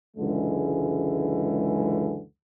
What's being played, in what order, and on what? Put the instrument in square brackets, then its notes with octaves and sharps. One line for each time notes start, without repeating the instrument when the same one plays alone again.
[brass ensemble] C#2 F#2 D3 E3 G#3